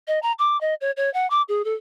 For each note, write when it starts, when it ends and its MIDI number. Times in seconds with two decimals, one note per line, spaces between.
0.07 0.19 75
0.22 0.32 82
0.39 0.59 86
0.61 0.74 75
0.81 0.91 73
0.97 1.12 73
1.14 1.29 78
1.30 1.42 86
1.49 1.65 68
1.65 1.74 69